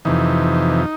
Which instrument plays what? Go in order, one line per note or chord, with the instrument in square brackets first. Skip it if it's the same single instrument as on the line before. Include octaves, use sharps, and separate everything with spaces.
[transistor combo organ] F2 C3 E3 D#4